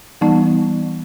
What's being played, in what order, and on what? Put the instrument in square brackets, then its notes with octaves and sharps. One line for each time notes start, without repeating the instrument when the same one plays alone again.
[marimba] E3 G3 B3 D#4